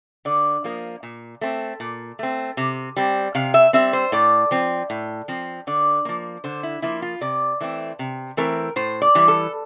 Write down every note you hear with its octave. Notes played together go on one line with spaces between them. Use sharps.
D3 D5
F3 A#3
A#2
A3 C4
A#2
A3 C4
C3
G3 C4
C3 F5
E5
G3 C4 E5
C5
A2 D5
F3 C4
A2
F3 C4
D3 D5
F3 A#3
D3 C5
E4
F3 A#3 E4
F4
C3 D5
E3 A3 C4
C3
E3 A3 C4 A#4
A2 C5
D5
E3 G3
A4